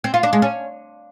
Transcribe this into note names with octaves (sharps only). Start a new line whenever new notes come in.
C4
F4
D4
G#3
C#4